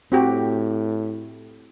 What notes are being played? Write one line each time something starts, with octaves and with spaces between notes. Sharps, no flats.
A2 C4 F#4 G4